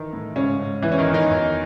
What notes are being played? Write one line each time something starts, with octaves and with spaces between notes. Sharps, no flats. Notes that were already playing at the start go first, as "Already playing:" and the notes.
Already playing: D#3 E3 D#4
A2
G#2 C#3 C#4
G#2
E2 E3 E4
C#4
D#3 D#4
E2
D#3 D#4
F#2